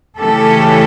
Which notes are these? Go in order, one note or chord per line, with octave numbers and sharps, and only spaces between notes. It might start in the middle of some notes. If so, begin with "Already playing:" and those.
C#3 E3 A3 C#4 G4 A4